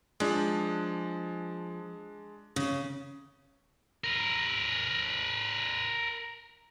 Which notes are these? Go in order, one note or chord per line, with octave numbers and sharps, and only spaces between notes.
F3 G#3 D4
C#3
A#4 B4